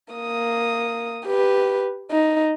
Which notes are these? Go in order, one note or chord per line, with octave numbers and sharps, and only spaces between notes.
A#3 D#6
G4 B4
D#4